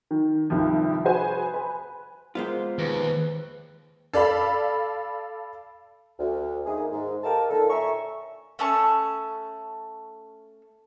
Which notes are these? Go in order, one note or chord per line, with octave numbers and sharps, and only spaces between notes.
D#3
C2 G2 D#3 F3
F#4 G#4 B4 C5 G#5
B4 G#5
F3 G#3 A#3 B3 F4 C5
D#2 B4
A4 D5 F5 B5
D2
D#3 G#3 A#3 E4 G#4
G#2
G4 A#4 D#5 F5 A5
A#2 D3 D#3 A4
E5 G#5 A#5 C#6
A3 C#4 A5 C#6